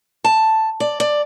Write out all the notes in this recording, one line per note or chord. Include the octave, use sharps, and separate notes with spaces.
A5
D5
D5